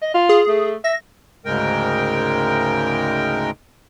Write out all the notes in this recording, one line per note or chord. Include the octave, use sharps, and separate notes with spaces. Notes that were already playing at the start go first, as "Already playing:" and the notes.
D#5
F4
G#4
A3
E5 A#6
D2 G#2 C#3 G#3 A#4 G5